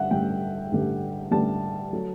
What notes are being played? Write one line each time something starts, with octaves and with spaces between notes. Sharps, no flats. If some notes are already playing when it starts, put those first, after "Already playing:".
Already playing: G2 D3 G3 E5 F#5
A1 G2 D3 G3 G5
A1 G2 D3 G3
A1 G2 D3 G3 A5
F#3 A3